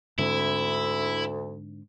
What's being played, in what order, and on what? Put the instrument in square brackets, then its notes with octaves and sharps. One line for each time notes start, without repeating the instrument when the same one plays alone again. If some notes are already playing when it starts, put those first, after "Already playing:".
[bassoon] D2 [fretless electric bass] G#2 D3 C4 [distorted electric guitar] E4